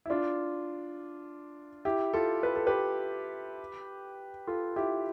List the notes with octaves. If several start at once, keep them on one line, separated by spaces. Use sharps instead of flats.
E4
D4 F4
E4 G4
F4 A4
B4
A4
G4 B4
F4 A4
E4 G4